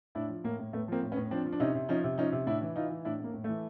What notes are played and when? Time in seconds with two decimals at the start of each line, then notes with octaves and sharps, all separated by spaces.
0.15 A2 D4 E4
0.29 F3
0.44 A2 A#3
0.59 A2
0.73 A2 A3 B3
0.88 F3 A#3 C4
1.02 A2
1.12 B3 C#4
1.17 A2
1.31 F3 C4 D4
1.46 F3
1.52 D4
1.60 C3 C#4 D#4
1.75 C3
1.89 F3 C#4 D#4
2.04 C3
2.18 F3 C#4 D#4
2.32 C3
2.47 A2 D4 E4
2.62 E3
2.76 E3 D#4 F4
2.90 E3
3.05 A2 D4 E4
3.20 A2 A#3
3.34 A2
3.44 E3 A3